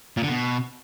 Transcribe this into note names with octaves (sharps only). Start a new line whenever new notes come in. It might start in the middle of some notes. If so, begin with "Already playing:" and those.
A#2
D3
B2